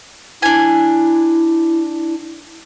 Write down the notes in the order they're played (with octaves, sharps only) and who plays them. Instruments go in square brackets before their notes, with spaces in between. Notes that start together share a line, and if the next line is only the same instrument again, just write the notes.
[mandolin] D4 G#5 [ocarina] E4